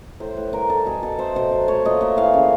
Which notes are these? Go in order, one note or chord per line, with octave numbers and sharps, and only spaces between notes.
A2 C5
A2 B4
G3 A#4
G3 A4
B2 G#4
B2 A4
A3 C5
B2 C5
F#3
A3 C#5
A#2 D#5
A#2 E5
E3 F5
C#3